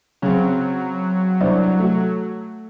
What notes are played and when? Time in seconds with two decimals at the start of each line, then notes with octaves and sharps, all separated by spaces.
0.22 C#3 F#3 C4
1.41 C2 D4 C5
1.79 A3 F#4